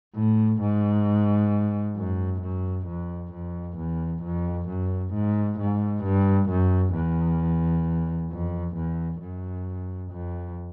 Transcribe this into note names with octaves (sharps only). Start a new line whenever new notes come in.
A2
G#2
F#2
F#2
F2
F2
E2
F2
F#2
G#2
G#2
G2
F#2
E2
F2
E2
F#2
F2